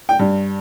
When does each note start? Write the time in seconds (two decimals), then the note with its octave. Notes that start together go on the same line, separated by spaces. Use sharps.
0.09 G5
0.19 G2